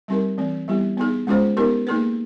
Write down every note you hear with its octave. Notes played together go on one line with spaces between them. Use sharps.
G3 C4 D#4 G4 A#4
E3 A3 C4
G3 B3 E4 G4
B3 D#4 G#4
G#3 C#4 F4 G#4 C5
B3 D#4 G4 A#4
A#3 D#4 G#4 B4